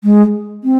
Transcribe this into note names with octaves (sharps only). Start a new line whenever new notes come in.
G#3
C4